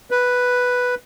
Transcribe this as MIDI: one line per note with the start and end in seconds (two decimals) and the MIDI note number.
0.11 0.95 71